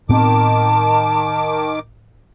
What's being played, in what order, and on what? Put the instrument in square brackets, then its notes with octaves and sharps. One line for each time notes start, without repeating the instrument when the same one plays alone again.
[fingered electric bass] A2 B3 C4 [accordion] D#3 D6 [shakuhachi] A5